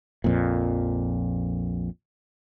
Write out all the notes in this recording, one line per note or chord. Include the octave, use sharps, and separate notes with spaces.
A#1 F2 A#2